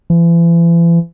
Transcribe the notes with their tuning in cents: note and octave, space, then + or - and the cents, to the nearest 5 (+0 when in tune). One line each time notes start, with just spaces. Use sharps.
E3 +40